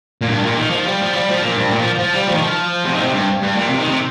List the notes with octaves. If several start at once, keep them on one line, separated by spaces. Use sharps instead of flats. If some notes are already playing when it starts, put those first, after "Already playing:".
A#2
G2
A#2
D#3
F3
G3
F3
G3
F3
A#2
G2
A#2
F3
F3
G3
F3
D#3
F3
C3
D#3
A#2
C3
G2
G2
A#2
C3
D#3
C3